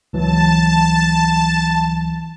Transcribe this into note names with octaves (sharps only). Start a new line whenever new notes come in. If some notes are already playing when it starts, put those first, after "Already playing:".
C#2 E3 F#3 A5